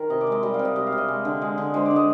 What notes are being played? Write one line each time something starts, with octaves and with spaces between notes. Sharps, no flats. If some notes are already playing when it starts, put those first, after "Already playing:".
Already playing: D#3 A#4
C3 D#5
D5
G#3
D#5
G3 D#5
F5
C3
D#5
G3 D#5
F5
C3
D#5
G#3
D3
G#3
D3
G#3 C5
D3 D5
D#5